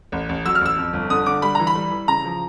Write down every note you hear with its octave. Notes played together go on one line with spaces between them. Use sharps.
A1
A1
F#3 E6
F6
A1 E6
F2
G1
D3 D#6
D3 D6
G3 B5
E3 A#5
B5
G3
E3
C#3 A#5
F3